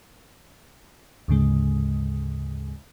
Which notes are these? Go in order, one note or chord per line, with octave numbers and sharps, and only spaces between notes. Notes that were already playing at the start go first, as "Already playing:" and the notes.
D2 G#2 C#3 G#3